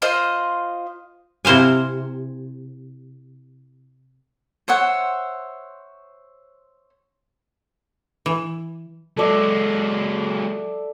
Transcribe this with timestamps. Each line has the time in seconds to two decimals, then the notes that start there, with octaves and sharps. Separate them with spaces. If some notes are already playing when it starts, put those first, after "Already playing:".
0.02 F4 C5 D#5
1.45 C3 E4 C5 F5 G#5
4.68 C5 C#5 E5 F#5
8.26 E3
9.17 F#3 G#3 A4 D5 E5